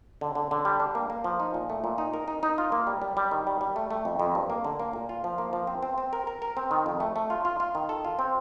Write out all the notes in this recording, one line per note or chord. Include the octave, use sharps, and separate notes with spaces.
D3
D3
D3
G3
D4
A#3
A#3
F3
D#4
A#2
A3
A#2
D#4
A#4
D#4
D#4
F4
A#3
G3
G3
G3
D#3
G3
G3
A3
A3
F2
F2
G2
A#3
D3
A#3
A#2
F4
F3
A#3
F3
C4
C4
C4
A#4
A#4
A#4
C4
D#3
F2
A3
A3
F4
F4
F4
D#3
A4
F4
C4